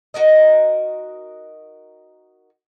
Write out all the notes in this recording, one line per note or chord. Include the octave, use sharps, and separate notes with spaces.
D#4 F#4 A#4 D#5